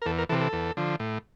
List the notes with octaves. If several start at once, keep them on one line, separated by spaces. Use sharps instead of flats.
A#4
E2 A4
A#4
C3 E3 A4
A4
E2
D3 F3
A2